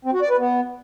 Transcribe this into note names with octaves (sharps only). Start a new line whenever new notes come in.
C4
F#4
D5
B4
B3